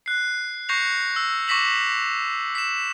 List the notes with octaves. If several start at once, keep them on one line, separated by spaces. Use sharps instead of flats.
F#6 C7
C#6 G6 A#6 C7 C#7 F7
E6
C#6 D6 A#6 B6 E7 F#7
B6 E7